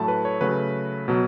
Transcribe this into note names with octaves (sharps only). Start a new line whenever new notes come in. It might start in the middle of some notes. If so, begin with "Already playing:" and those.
Already playing: A2 F#3 A3 A5 B5
B4
C#5
C#3 F#3 A3 B4
B2 F#3